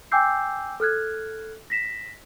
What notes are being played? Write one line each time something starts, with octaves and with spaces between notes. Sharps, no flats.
G5 G#5 D6 E6 G6 C7
A4 F6 F#6 G#6
A#6 B6 E7